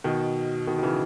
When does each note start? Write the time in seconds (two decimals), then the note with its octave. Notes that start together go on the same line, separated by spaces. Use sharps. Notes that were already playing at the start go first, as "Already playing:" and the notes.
0.04 B2 D#3
0.67 B2 D#3
0.78 D#3
0.83 C#3 E3